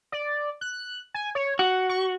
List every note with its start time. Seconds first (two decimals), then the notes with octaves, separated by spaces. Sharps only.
0.12 D5
0.61 F#6
1.14 G#5
1.35 C#5
1.59 F#4 F#5
1.89 C#6